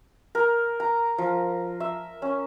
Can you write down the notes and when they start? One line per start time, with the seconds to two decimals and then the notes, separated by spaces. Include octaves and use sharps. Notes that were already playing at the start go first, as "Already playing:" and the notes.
0.35 A#4
0.80 A#5
1.18 F3
1.80 E5
2.22 C#4